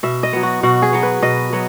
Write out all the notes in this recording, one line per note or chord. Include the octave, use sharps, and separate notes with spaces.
B2 E5
D#5
F#3 B3
F#4
B2 F#4
G#4
F#3 B3
B4
B2 D#5
F#3 B3